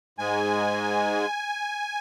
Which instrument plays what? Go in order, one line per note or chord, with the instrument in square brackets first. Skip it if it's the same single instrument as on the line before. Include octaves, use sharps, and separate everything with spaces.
[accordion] G#2 G#3 G#5